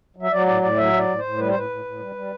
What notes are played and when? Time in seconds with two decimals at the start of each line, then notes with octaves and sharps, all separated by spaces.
0.16 F#3
0.22 E5
0.31 F#3 D5
0.46 A2 D5
0.62 A2 D5
0.77 F#3 E5
0.93 A2
0.98 D5
1.08 A2
1.18 A2 C5
1.38 G3 B4
1.49 C5
1.54 A2 B4
1.70 A2
1.85 A2
2.00 G3
2.15 G3